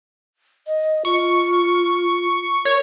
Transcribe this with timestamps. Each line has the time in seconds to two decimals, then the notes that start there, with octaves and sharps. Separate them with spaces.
0.67 D#5
1.05 F4 C#6
2.65 A#4 C#5